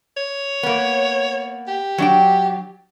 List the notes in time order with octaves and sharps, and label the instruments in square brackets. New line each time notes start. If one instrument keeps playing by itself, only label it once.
[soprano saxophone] C#5
[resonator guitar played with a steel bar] A#3 B3
[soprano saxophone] G4
[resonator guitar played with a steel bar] F#3 D4 G5